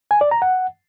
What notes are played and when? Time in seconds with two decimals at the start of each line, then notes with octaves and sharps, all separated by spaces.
0.11 G#5
0.21 D5
0.31 A#5
0.42 F#5